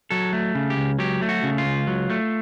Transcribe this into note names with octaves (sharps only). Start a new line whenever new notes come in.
F#3 A4
A3
C#3
G4
C#2
F#3 G4
A3
F#4
C#3
F4
C#2
F#3
A3